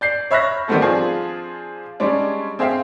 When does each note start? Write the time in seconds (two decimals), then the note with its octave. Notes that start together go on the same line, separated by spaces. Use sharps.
0.01 D5 G6 C7
0.31 C#5 E5 B5 F6 F#6 A#6
0.68 D#3 G3 A3 B3 C4 A4
0.81 F3 C4 D4 F4 G#4
2.00 G3 G#3 C#4 D4
2.59 C4 G#4 E5 F5 G5